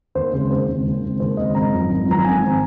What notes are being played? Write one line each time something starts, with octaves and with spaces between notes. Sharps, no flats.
D#2 C5
C#3 G#3 C4
D#2 C5
C#3 G#3 C4
D#2
C#3 G#3 C4
D#2 C5
C#3 G#3 C4 D#5
G#1 A#5
F#2 F3 C4
G#1
F#2 F3 C4 A#5
G#1 G#5
F3 C4